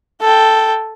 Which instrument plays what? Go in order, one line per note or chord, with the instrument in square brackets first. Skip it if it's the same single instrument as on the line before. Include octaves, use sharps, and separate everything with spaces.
[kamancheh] A4 G5